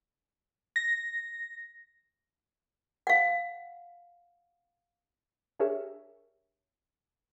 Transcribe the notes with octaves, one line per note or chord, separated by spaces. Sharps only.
A#6
F5 F#5
D4 G4 G#4 A#4 C#5 E5